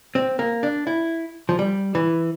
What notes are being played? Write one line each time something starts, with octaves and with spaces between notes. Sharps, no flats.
C4
A#3
D4
E4
F3
G3
E3